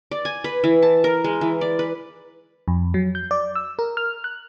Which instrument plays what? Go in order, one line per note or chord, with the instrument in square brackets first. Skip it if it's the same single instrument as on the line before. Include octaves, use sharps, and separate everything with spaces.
[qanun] D5
G#5
B4
E3
A5
A#4
G#3
E3
D5
B4
[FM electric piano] F2
F#3
G6
D5
E6
A#4
F6
F#6